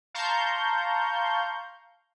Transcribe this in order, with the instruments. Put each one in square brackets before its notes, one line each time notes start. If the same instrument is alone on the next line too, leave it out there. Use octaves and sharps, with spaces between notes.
[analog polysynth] F5 A5 A#5 C6 C#6 G6